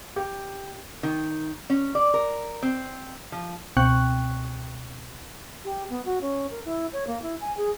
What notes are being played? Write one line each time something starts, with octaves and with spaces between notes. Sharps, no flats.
G4
D#3
C#4
D5
A#4
C4
F3
C#2 B2 C4 G5 C#6 F#6
G4
B3
F#4
C#4
A#4
E4
C#5
A#3
E4
G#5
G#4